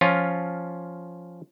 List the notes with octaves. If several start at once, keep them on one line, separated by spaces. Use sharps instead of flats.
F3 C#4 F4